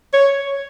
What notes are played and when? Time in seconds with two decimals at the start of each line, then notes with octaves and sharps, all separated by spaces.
0.13 C#5